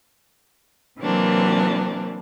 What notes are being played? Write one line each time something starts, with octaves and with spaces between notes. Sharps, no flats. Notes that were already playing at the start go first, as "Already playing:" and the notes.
C3 E3 F#3 A#3 C4 D4